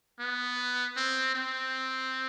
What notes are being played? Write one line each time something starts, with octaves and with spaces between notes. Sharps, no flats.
B3
C4
C4